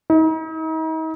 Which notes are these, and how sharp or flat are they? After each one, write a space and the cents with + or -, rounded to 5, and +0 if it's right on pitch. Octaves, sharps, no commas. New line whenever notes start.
D#4 +40